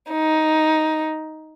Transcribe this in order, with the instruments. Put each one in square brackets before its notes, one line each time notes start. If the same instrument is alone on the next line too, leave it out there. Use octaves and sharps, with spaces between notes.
[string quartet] D#4